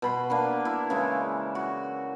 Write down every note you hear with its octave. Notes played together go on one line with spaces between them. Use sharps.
B2 B5 C6
A#3 D4 B4
E4
C#3 E3 G#3
F#4